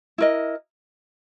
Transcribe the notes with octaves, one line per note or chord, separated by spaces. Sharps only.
E4 A#4 D#5